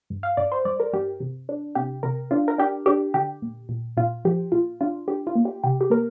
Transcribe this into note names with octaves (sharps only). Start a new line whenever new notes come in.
G2
F5
G2 D5
C5
G2 D5
A#4
G2 G4
C3
D4
C3 G4
C3 A#4
D4 F4
A#4
D4 G4
D4 G4
D3 G4
A#2
A#2
A#2 F4
F3 G4
A#2 F4
D4 F4
D4 G4
F4
A#3
G4
C3 G4
G4
A#3 A#4